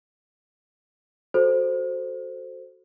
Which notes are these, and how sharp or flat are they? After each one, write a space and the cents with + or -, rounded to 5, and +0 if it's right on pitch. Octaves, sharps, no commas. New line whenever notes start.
F#4 +0 A4 +0 C5 +0